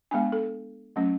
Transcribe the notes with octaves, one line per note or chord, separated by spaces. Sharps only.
G#3 B3 D4 G#5
A4
F#3 A3 C#4